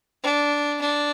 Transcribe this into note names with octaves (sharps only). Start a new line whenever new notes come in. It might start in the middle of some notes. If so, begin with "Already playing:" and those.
D4
D4